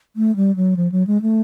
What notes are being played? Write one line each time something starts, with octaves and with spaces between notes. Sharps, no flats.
A3
G3
F#3
F3
F#3
G#3
A3